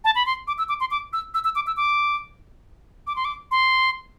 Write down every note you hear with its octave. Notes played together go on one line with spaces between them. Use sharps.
A5
B5
C6
D6
E6
D6
C6
D6
E6
E6
E6
D6
E6
D6
D6
C6
D6
C6